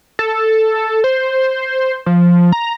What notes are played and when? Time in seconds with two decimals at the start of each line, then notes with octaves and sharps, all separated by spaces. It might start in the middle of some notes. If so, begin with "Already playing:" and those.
0.19 A4
1.04 C5
2.06 F3
2.52 A#5